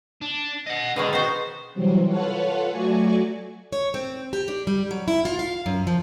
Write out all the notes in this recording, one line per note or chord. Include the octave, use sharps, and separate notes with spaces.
D4
D#5 F#5
B2 D3 D#3 G#3
B3 D#4 F#4 C5
C3 E3 F#3 G3 C4
F4 A4 B4 C#5 F5 F#5
F#3 A3 F#4 D5 G#5 C#6
C#5
C4
G4
D4
G3
F#3
E4
F4
F5
F#2
F3